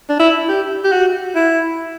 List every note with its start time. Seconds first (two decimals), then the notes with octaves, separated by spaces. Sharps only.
0.09 D4
0.19 E4
0.49 G4
0.84 G4
0.92 F#4
1.35 E4